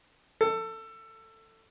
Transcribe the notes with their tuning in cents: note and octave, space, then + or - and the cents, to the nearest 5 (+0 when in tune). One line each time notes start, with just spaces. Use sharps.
A4 +20